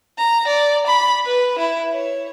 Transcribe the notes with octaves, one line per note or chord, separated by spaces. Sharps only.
A#5
D5
B5
B4
E4
C#5